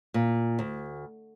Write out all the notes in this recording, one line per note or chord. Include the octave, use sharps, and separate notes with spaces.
A#2
D2